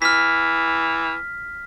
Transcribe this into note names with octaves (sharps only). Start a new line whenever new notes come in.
E3 F6 B6